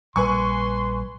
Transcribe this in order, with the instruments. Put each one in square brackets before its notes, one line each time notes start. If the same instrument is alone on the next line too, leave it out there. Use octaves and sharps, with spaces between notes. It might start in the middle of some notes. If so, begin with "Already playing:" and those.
[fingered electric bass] A#1 G3 [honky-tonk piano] B4 G#5 C#6 [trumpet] C6